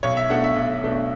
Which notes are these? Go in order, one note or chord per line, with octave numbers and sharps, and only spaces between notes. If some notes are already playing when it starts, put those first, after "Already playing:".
B1 C#5
E5
B2 A3 D4 F#5
E5
B1
B2 A3 D4